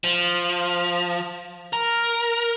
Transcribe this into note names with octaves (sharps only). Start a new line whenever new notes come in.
F3
A#4